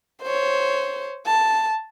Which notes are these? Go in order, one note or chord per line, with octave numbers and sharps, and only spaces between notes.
C5 C#5
A5